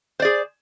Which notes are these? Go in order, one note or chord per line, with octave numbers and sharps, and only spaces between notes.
G#4 C5 D5